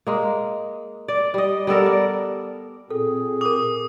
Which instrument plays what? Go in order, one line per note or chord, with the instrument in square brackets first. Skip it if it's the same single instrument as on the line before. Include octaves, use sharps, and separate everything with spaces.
[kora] G#3 A#3
D5
G3 D#5
G3 B3 A4 A#4
D5
[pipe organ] A#2 C4 [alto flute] G#4 [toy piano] A4
[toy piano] A#4 D6 [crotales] D#6